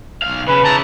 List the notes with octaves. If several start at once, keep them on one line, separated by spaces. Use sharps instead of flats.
B1 F5
C#3 B4
C#3 E3 A5 A#5